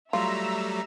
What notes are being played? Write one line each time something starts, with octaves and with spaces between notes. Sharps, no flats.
F#3 G3 A3 F4 E5 A#5 E6